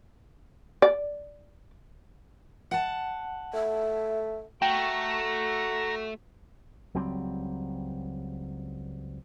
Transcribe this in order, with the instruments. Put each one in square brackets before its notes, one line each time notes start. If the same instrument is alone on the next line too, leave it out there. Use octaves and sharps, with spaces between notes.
[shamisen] D5
[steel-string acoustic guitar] F#5 A5
[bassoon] A3 [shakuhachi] E5
[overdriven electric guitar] A3 [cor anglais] F#4 [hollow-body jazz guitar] G5 [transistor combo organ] A#5
[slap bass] C#2 F#3 G3 C4